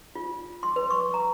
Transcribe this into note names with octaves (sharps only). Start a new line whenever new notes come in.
F4
C6
B4
C#6
A#5